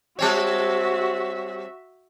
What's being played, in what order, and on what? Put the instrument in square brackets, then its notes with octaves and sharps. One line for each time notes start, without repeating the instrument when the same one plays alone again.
[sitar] G3 C4 C#5 [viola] F#4 E5